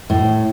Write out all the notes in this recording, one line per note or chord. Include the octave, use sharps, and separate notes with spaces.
A2